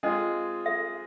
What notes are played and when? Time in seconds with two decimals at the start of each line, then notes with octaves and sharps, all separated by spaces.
0.03 G#3 C4 F4 G#4 D#5
0.66 E5